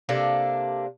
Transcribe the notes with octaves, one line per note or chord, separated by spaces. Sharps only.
C3 A#3 D4 A4